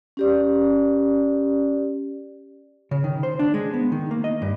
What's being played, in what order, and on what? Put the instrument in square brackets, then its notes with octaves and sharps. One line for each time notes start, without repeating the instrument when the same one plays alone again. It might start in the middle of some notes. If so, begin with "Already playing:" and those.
[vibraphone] C#4 G4 D5
[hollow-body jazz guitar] C#3
D#3
C5
D4
G#3
B3
D#3
A#3
D#5
G2